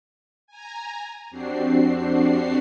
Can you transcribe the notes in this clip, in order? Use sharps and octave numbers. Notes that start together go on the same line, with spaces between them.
G#5 A#5
F2 C4 D4 F#4 G4 C7